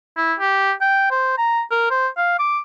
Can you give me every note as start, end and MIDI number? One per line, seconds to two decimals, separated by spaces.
0.17 0.34 64
0.40 0.72 67
0.81 1.07 79
1.11 1.35 72
1.38 1.62 82
1.71 1.88 70
1.91 2.08 72
2.17 2.37 77
2.39 2.59 86